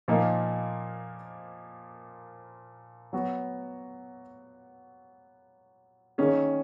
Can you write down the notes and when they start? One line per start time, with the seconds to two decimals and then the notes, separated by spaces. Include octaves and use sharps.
0.08 A#2 F3 A#3 D#4
3.13 F#3 B3 F#4
6.18 D#3 A#3 C#4 G#4